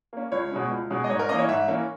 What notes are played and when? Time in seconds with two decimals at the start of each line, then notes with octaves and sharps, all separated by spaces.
0.13 A#3 C#4
0.32 C#2 C#5
0.51 B2 G#3 C#4
0.71 C#2
0.90 B2 G#3 C#4
1.04 D#5
1.10 G#2 C#5
1.19 A#4
1.29 E3 A#3 C#4 D#5
1.39 C#5
1.48 G#2 E5
1.68 E3 A#3 C#4